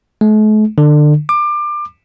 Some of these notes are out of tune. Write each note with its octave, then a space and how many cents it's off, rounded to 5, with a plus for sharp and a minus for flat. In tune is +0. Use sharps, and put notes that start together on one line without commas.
A3 -45
D3 +25
D6 +25